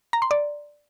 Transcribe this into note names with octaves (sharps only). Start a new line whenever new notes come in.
A#5
C6
D5